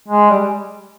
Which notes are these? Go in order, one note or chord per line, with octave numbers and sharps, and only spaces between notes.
G#3
G3